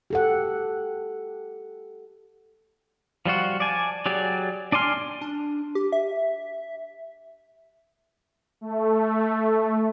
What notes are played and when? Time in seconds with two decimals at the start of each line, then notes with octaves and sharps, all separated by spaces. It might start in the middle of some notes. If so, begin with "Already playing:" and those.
0.10 G4 A4 F#5
3.26 F3 G3 F4 F#4
3.60 D5 G#5 A5
4.06 F#3 G4 G#4 D5
4.72 D4 D5 G#5 C6 F6
5.21 D4
5.75 G4
5.92 E5
8.61 A3